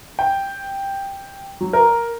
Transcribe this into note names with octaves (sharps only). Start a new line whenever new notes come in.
G5
F#3
A#4